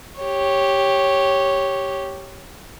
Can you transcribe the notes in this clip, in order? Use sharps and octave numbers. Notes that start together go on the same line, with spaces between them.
G4 C#5